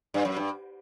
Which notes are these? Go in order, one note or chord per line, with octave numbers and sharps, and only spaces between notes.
G2
F#2
G2